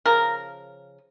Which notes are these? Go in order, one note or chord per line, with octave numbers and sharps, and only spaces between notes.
C#3 F3 A#4